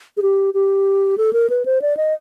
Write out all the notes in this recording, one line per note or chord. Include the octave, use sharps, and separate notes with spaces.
G#4
G4
G4
A4
A#4
B4
C5
D5
D#5